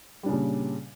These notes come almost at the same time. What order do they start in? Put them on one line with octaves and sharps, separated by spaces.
G3 D4 C#3 A#2